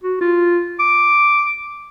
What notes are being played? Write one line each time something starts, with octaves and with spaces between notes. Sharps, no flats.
F#4
F4
D6